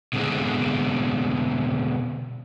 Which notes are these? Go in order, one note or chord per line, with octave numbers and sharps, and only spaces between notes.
B2 D3 G#3 C4